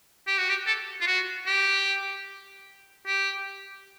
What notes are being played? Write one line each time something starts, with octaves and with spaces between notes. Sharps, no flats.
G4
F#4
G4
A4
F4
F#4
G4
G4